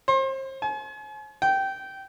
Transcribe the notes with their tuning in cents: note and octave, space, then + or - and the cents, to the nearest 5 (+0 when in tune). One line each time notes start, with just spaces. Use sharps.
C5 +35
G#5 +40
G5 -15